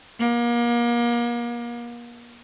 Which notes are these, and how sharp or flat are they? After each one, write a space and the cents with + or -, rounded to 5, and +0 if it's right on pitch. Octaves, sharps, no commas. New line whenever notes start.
A#3 +35